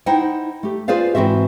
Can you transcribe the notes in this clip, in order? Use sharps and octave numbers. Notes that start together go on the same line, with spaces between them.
D#4 E4 C5 F#5 G5
A3 G4
F4 G#4 B4 C5 D5 F5
G#2 E3 C4 F#4 E5